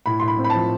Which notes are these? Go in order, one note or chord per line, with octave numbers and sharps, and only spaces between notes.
A2 B5
C6
A2
B5
C4
B5
F3 A5